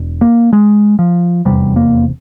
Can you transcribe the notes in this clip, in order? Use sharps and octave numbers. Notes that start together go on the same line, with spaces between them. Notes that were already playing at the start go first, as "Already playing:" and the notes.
Already playing: E1
A#3
G#3
F3
F1 E2 C3 G3
A#3